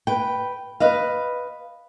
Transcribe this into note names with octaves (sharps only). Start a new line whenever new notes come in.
B4 G5
B4 D#5 F5